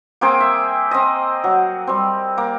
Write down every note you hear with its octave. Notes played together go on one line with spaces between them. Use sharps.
A#3 C4 G#4 G5
E5
C4 D#5
F#3
G3 C4
A#3